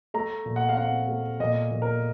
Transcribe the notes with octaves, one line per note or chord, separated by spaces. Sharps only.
A3 A#5
A#2
F#5
F5
C4 F#5
A3
A#2 D#5
A#2
A#4